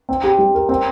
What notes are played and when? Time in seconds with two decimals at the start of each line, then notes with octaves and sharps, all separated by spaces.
0.09 C4
0.24 G4
0.38 G3
0.55 A#4
0.69 C4